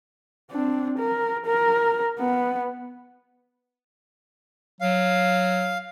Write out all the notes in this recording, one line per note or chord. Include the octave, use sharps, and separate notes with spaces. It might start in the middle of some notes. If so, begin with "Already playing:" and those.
C4 D4
A#4
A#4
B3
F#3 F5